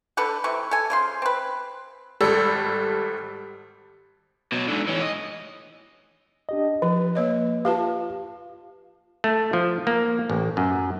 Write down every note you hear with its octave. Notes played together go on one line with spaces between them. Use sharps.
D3 A4 B4 F#5
C3 E3 C#6
A4 G#5
C#3 F3 C6
C4 B4
G#1 G3 A4 E6
B2 F#3
G#2 D3
E3 C#4
D#5
D4 G4 D#5
F3 B4
A#3 C#5 D#5
F4 G4 B4 F5 A5
A3
F3
A#3
A1
F#2